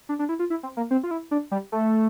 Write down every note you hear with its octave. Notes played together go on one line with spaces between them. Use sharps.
D4
D4
E4
F4
E4
C4
A#3
C4
F4
E4
D4
G3
A3